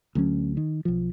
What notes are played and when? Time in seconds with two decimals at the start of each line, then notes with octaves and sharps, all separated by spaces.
0.15 D2 F#3 C#4
0.57 D#3
0.85 B1 F3